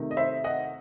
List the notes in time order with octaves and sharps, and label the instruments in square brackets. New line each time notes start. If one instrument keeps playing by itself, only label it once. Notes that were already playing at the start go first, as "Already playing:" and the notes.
Already playing: [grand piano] C3 D#3 A3
D#5
C5 E5
D#5 F#5